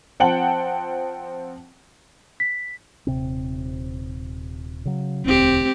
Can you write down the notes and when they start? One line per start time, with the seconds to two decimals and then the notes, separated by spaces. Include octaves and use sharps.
0.20 F3 C4 F#5 G5 A5 F#7
2.40 B6
3.07 D#1 C3 C4
4.85 C#3 F#3
5.25 E1 D2 C4 G4